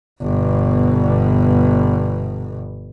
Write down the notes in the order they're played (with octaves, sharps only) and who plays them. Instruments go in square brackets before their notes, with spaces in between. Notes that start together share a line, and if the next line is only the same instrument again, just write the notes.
[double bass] G1 B2